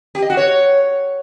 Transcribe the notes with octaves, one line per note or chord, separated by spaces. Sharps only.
G4
D#5
F#4
C#5